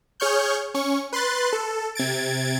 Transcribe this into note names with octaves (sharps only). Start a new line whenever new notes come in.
G#4 C#5 C#6 F6 G6
C#4 C#6
B4 C6 F#6 A6
A4
C3 G#6 A6 D7